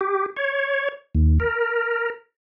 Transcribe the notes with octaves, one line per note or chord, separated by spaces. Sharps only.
G4
C#5
D#2
A#4